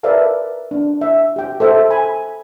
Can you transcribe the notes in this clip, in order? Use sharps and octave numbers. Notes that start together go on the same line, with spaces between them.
A#4 B4 D5 E5 F5 A5
D4
E5
G4 G5
A4 C5 E5
G#5 B5